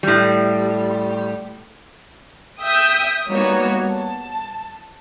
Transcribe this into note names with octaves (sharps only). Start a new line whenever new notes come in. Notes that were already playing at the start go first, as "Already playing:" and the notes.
A2 G3
E5 G5 D#6 E6 G6 B6
G3 A#3 B3 D#4 F#4 C#5
A5